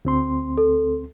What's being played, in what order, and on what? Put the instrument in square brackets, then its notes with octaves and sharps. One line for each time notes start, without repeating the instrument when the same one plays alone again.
[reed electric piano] D2 C4 C6
[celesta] A4